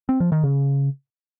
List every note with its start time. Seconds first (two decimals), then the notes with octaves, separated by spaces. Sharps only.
0.09 C4
0.20 F3
0.32 D#3
0.43 C#3